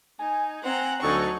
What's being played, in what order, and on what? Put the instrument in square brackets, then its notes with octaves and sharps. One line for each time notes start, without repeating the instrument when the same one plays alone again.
[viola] D#4 [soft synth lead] G#5
[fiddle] C4 [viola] F#5 A#5
[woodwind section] D2 A4 [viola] F#3 D#4 [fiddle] G#5 C#6